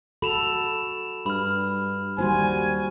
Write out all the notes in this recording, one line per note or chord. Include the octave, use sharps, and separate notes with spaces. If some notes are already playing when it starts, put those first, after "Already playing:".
F#4 A4 B5 E7 F7
G2 B5 F6
D#2 G3 F#4 C5 G#5